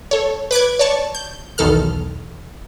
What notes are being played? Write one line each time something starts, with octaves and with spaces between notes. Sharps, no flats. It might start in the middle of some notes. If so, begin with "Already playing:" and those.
A4 C#5
B4 D6 F#6 G#6
C#5 D5 A5 C#6
G6
B1 E2 D#3 A4 F6